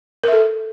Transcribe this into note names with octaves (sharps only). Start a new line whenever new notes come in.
A4 A#4 E5